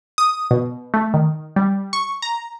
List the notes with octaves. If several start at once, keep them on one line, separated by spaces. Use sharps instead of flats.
D#6
B2
A3
D#3
G3
C#6
A#5